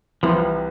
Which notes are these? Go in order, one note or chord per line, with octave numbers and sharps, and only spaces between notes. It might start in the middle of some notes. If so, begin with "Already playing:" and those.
C2 C3 E3 F3